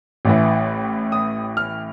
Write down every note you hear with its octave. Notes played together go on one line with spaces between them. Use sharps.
A1 A2 E3
D#6
F6